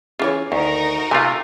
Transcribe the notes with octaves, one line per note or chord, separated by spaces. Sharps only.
C#3 E3 F4 C#5
D2 D#3 D#4 F#4 A#4
C3 A3 F4 F5 G#5